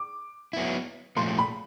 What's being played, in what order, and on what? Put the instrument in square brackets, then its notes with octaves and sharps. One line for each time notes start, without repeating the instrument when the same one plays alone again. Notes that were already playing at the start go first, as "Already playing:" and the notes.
Already playing: [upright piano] D6
[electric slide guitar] F#3 B3 E4
[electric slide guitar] A#2 F3 A3 [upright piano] C6
[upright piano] B5